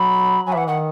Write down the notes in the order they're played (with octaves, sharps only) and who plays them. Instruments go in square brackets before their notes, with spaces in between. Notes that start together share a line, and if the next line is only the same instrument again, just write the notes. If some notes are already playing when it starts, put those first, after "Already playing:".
Already playing: [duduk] F#3 [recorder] B5
[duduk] F#3 [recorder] G#5
[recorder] E5
[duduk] E3 [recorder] F#5
[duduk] D#3 [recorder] F#5